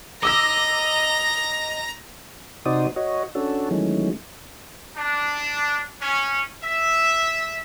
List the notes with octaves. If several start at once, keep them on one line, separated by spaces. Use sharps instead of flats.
D#5 A#5 D6 E6 A#6
C3 D#4 F#4 C5 D5 D#6
F#4 C#5 D#5
C#4 D4 F#4 A4
D#3 E3 F#3 G#3 A3 C#4
D4
C#4
E5